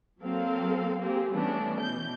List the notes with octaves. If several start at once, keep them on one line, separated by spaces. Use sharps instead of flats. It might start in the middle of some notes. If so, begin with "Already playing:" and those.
F#3 A#3 C4 A4 F5
A#3 C4 G4 G#4
E3 G3 A3 B3 C#4 D4
B2 E3 G6